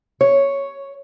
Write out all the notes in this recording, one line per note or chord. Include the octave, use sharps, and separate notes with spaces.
C#5